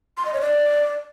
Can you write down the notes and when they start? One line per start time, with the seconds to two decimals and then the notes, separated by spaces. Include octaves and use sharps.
0.17 C6
0.25 D#5
0.33 C#5
0.41 D5